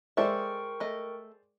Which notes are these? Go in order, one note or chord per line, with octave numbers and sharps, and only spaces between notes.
G#3 A4 A#4 C5 D5 E5 G5 C#6
A3 D#5